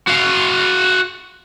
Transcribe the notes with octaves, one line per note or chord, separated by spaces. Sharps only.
F#4 F5